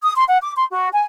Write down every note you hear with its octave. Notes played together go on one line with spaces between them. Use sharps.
D#6
C6
F#5
D6
C6
F#4
G#5